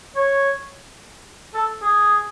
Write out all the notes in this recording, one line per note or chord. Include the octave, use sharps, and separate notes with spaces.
C#5
A4
G#4